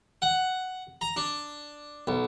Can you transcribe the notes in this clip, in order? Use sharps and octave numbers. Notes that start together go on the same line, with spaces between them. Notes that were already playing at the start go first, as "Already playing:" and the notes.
F#5
A#5
D4
B1